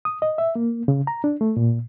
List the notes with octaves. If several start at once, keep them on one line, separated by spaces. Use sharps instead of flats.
D#6
D#5
E5
A#3
C#3
A#5
D4
A3
A#2